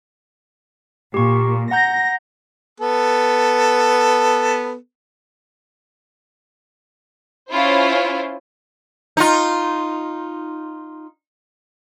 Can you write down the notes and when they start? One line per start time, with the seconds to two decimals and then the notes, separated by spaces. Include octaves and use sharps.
1.14 A#2 G4 C#6
1.71 F#5 A#5 G6 A#6
2.80 B3 A4
7.49 C#4 E4 F4 C5
9.17 D#4 F4